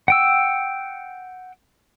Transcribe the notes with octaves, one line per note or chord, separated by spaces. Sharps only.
F#5 G5 E6